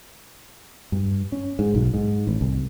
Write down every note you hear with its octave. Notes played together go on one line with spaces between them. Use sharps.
G2
C#4
G#2
B1
G#2
A1
C2